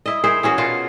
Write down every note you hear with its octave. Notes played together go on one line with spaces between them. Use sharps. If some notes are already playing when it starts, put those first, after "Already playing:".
E4 D#5
E4 G#4 A#4 C5
E3 C#4 F#4 G#4
B2 F4 F#4 A#4